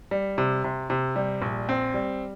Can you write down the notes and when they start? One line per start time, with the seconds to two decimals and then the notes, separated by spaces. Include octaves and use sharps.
0.11 G3
0.38 C3
0.64 C3
0.90 C3
1.16 G3
1.42 A#1
1.69 C4
1.94 G3